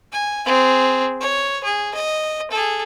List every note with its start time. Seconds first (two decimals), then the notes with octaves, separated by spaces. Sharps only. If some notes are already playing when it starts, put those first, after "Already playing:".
0.12 G#5
0.46 C4 G#4
1.21 C#5
1.64 G#4
1.95 D#5
2.51 G#4 A4